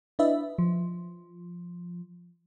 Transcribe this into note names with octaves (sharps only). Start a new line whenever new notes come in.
D4 E4 B4 D#5 E5
F3